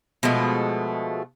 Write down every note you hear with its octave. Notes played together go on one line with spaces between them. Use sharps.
B2 F3 G#3 A3